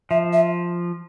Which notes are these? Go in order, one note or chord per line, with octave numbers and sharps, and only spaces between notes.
F3 E5
E5